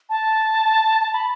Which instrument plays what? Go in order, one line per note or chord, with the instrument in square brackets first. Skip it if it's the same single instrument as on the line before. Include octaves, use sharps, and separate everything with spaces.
[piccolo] A5
A5
B5